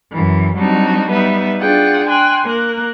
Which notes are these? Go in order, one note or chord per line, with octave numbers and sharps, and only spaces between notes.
F#2 E3
F#3 G3 C4 D4 D#4 F#4
G3 B3 D#4 B4 E5
D4 F4 G#4 F#5 G5
G5 G#5 C6 F#6
A#3 A#4 F#6